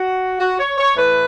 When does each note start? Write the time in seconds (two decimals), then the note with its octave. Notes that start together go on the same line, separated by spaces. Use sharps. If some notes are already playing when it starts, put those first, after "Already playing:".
Already playing: F#4
0.40 F#4
0.59 C#5
0.78 C#5
0.96 A2 E3 B4